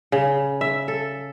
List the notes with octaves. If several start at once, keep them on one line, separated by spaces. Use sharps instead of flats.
C#3
E5
A4